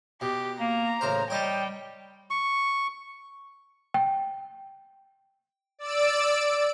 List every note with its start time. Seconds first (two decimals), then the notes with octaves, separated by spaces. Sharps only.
0.21 B2 G4
0.60 A#3 A#5
1.01 A1 C#3 A#4 C5
1.30 G3 C#5 D#5 G5 A5
2.30 C#6
3.94 G5
5.79 D5 E6 D7